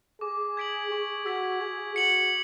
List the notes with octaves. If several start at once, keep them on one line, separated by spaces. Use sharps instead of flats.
G#4 D6
G#6 B6 D7 F#7
G#4 C#6
F#4 E6 G#6 B6
G#4 G#6
F#4 C#7 F#7